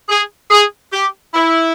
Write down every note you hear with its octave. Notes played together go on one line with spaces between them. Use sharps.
G#4
G#4
G4
E4